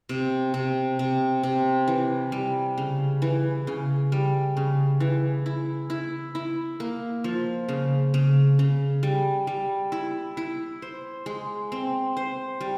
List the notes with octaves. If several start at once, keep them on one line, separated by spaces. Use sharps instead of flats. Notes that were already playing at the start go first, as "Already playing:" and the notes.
C3
C3
C3
C3
E3
G3
C#3
E3
C#3
G3
C#3
E3
E4
E4
E4
A#3
F3
C#3
C#3
C#3
G3
G3
E4
E4
C5
G#3
C4
C5
G3